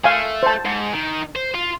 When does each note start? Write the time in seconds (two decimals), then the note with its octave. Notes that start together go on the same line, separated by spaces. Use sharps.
0.04 A3 F5 G#5
0.43 C5 A5
0.65 G#2
0.93 D#3
1.36 C5
1.55 F4